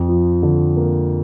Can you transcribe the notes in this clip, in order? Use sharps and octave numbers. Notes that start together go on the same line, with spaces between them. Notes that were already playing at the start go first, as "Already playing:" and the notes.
Already playing: F2
F3
D3
A#3